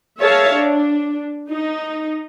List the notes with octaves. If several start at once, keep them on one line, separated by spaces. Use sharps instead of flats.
G#4 A#4 C#5 E5 F5 A5
D4
D#4